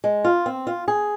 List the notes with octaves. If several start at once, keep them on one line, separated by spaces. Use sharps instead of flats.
G#3
F4
C4
F4
G#4